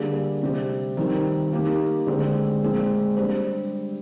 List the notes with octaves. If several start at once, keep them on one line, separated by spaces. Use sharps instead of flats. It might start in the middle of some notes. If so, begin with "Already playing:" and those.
Already playing: D3 G3 A#3 D4 G#4
C3 G3 C4 G4
D#3 G3 C4
A#3 D#4 G4
D3 G#3 C4
A#2 G#3 C4
G3 D4 G4 C5